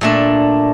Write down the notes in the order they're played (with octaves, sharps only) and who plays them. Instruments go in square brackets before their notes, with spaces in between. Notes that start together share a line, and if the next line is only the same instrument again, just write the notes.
[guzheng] A#2 A3 D4